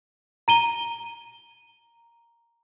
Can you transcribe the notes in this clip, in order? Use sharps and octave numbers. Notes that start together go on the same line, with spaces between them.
A#5 D#7 G7